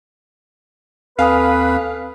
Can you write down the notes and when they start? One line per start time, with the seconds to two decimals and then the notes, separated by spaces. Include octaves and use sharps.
1.19 D#2 C4 A4 B4 F5 G#5 D#6